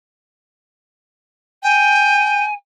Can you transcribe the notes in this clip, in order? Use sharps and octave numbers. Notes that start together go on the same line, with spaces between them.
G5 G#5